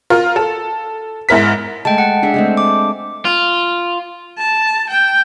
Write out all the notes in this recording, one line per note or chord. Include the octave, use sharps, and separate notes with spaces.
F4 A#4
A4
G#2 E4 A#4 B6
G#3 A3 G5 A5
F#5
D4 G#4 E5
G#3 A3 C4
D6
F4
A5
G5